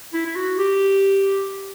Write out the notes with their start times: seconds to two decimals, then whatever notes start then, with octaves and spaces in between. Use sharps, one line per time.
0.13 E4
0.26 E4
0.35 F#4
0.57 G4